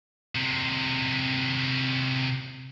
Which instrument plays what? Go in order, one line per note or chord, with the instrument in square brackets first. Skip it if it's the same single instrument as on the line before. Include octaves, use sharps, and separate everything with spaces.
[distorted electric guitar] C3 G#3